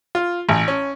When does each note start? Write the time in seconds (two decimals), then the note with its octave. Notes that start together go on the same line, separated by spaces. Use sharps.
0.15 F4
0.49 A1
0.68 C#4